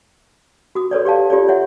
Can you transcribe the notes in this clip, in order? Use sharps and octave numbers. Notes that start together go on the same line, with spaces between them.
F#4 D#6
A4 B4 C#5 D5
G4 D5 F5 A5
F4 G4 A4 C#5 D5
C#5 E5 F#5